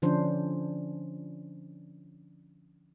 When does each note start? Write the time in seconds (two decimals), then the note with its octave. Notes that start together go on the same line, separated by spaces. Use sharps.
0.02 D3 F3 C#4 D4 C5